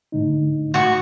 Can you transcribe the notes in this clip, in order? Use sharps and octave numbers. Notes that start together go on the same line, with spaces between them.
A2 D3 D#4
A2 F#4 C#6